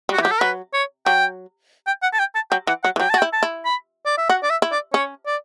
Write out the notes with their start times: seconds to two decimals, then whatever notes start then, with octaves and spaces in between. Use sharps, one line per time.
0.09 G3
0.13 F#4
0.18 E3
0.22 F#3 G4
0.32 A4
0.41 F#3 B4
0.73 C#5
1.06 F#3 G5
1.87 G5
2.03 F#5
2.13 A5
2.19 G5
2.35 A5
2.51 F#3 G5
2.67 E3 F#5
2.84 F#3 F#5
2.96 E3
2.99 F#3 G5
3.10 F#4 A5
3.19 G5
3.22 E4
3.33 A5
3.43 E4
3.65 B5
4.06 D5
4.18 E5
4.29 F#4 F#5
4.43 D5
4.50 E5
4.62 E4
4.72 D5
4.93 C#4 C#5
5.27 D5